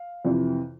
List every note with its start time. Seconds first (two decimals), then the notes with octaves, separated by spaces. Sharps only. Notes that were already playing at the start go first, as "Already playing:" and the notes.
Already playing: F5
0.25 F2 C3 E3